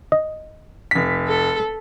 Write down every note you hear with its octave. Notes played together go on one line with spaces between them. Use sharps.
D#5
F1 B6
A4